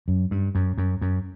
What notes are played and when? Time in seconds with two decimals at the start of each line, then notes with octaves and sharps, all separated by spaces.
0.08 F#2
0.31 G2
0.55 F#2
0.78 F#2
1.01 F#2